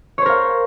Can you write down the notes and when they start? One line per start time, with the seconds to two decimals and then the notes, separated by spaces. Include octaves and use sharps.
0.18 C#5
0.22 C5
0.26 A#4
0.30 F5